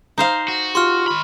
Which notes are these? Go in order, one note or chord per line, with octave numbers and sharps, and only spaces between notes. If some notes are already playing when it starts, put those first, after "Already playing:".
D#4 C5 F5
F#4
F4 G4 C6 C#6 F6
D#3 B5